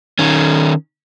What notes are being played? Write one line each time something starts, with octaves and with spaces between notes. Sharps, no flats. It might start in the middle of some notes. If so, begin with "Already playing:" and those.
D#3 C#4